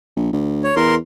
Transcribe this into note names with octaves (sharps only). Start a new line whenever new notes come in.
A#1
D2
C#5
E2 A#4 C6